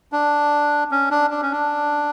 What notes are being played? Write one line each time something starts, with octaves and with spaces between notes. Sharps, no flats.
D4
C#4
D4
D4
C#4
D4